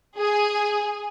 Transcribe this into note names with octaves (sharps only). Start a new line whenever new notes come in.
G#4